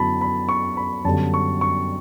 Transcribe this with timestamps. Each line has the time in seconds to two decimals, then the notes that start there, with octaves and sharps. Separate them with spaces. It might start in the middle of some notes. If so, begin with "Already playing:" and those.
Already playing: F#2 D3 F#3 B3 E4 A5 B5
0.21 B5
0.49 C#6
0.77 B5
1.05 F#2 D3 G3 B3 A5
1.34 C#6
1.61 C#6